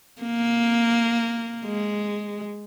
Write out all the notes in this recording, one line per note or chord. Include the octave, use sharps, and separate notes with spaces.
A#3
G#3